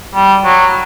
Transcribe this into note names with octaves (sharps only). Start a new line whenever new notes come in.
G3
F#3